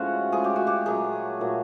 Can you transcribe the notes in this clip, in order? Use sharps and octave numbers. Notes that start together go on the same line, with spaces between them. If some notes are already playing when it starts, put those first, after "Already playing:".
Already playing: A2 F3 G#3 C#4 F#4
A2 F3 G#3 G#4
G4
F#4
G4
A#2 F#3 A3 G#4
A#2 F#3 A3